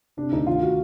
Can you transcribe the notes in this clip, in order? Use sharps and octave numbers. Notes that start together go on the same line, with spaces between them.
C3 D4
D2 D#4
D#3 F4
F#4